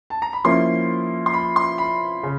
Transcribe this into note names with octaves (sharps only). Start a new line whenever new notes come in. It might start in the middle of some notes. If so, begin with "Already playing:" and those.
A5
A#5
B5
F3 A#3 C#4 E4 C6
C6
B5
C6
B5
C#3